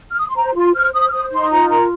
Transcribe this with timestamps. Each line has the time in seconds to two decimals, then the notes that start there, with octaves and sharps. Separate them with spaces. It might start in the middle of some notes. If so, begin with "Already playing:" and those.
0.10 F6
0.19 D#6
0.28 C6
0.36 C5 A#5
0.55 F4 C6
0.75 C5 F6
0.93 C5 D#6
1.07 F6
1.12 C5 D#6
1.32 D#4 C6
1.50 F4 A#5
1.70 A#4 A#5